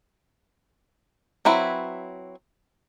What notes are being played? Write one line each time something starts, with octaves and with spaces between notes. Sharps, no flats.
F#3 C4 E4 B4